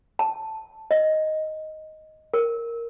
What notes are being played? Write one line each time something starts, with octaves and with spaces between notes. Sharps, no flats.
A5
D#5
A#4